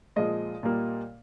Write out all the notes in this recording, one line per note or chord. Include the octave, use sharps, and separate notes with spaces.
A#2 F3 G#3 D#5
A#2 G3 A#3